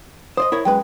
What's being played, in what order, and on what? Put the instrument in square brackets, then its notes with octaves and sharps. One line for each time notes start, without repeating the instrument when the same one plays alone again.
[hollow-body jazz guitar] C5 D5 D#5 [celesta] D#6
[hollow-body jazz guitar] E4 A#4 C#5
[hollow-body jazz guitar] F#2 G#3 B4 [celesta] G5